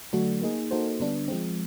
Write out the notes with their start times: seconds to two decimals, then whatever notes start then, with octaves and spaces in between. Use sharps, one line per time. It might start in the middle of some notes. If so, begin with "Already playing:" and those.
0.13 D3 F#3 A3 D4 F#4
0.42 A#3 D#4 G#4
0.71 A#3 D#4 F#4 A4 C5
1.00 D3 G3 B3 D4
1.28 F3 G#3 C4